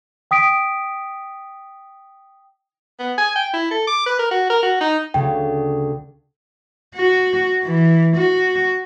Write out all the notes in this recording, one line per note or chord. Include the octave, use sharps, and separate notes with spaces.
G5 D#6 B6 D7
B3
G#5
G5
E4
A4
D6
B4
A#4
F#4
A#4
F#4
D#4
D2 C#3 G5
F#4
E3
F#4